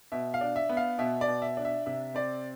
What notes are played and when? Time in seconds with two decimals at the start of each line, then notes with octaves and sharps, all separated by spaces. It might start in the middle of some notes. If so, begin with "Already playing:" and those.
0.12 B2 E5
0.34 F5
0.41 D4
0.56 E5
0.69 B3
0.77 F5
0.98 B2 E5
1.21 D5
1.28 B2
1.42 E5
1.57 D4
1.65 E5
1.86 C3 E5
2.15 C4 D5